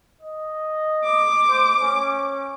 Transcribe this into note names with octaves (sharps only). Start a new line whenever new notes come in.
D#5
D6
C5
C#4